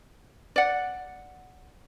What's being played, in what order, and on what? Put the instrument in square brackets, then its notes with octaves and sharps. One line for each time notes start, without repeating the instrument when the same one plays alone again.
[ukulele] D5 F#5